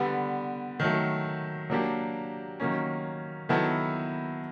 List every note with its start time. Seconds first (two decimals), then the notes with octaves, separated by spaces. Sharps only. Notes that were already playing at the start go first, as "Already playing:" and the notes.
Already playing: D3 G3 B3
0.80 D#3 F#3 A3
1.70 F#3 A#3 D4 G4
2.60 D#3 F#3 A#3 C#4
3.49 D#3 F#3 B3 E4 A4